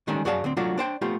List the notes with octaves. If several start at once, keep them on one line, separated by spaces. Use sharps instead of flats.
D3 D#3 G3 G#3 C#4 D4
F#2 F#4 G#4 D5 F5 A5
D2 C4
F#3 A3 D4 F4 F#4
D4 C5 G5
A3 B3 F4 G4